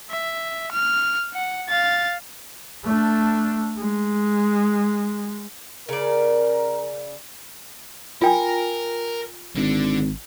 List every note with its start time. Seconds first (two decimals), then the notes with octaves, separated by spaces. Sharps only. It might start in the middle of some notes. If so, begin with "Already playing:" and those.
0.11 E5
0.72 F6
1.33 F#5
1.68 F5 A6
2.84 A3 D4
3.77 G#3
5.89 C#3 A#4 D5
8.22 F4 A#4 G5 G#5
9.56 G#1 D3 D4